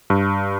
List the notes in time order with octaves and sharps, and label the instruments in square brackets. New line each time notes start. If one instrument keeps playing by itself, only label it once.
[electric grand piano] G2